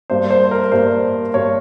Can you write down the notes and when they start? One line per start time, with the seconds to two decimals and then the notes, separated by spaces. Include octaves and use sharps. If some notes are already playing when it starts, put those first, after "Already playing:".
0.10 G2 G3 A#3 C5
0.31 C5
0.51 A#4
0.72 G2 G3 A#3 C5
1.34 G2 G3 A#3 C#5